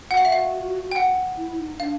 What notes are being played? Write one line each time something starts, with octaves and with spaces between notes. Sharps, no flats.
F#4 F#5
F5
E5
F5
G5
F#5
E4
D#4
D4 F5